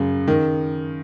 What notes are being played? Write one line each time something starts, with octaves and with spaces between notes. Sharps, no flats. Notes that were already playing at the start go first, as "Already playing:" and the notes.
Already playing: F#2 C#3
D#3